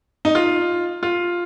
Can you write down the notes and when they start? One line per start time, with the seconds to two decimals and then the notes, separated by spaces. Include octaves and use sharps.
0.25 D#4
0.35 F4
1.03 F4